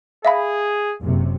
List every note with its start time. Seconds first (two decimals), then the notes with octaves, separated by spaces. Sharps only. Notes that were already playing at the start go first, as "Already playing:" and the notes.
0.25 G#4 E5 F5 B5
1.00 F#1 C3